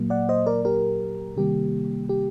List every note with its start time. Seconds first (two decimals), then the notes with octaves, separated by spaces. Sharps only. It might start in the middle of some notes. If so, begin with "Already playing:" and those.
Already playing: A#2 F#3 A#3
0.10 D5 F#5
0.29 C5 D#5
0.46 A#4 D5
0.65 G4 A#4
1.36 C3 D#3 G3 A#3 G4
2.09 G4